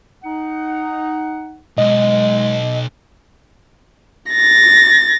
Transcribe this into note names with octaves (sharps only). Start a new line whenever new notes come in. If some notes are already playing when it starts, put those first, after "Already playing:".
D#4 F#5
B1 G#3 D#5
A6 A#6